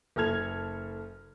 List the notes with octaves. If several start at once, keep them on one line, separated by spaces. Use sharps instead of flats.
F#1 A4 F6 G#6 F7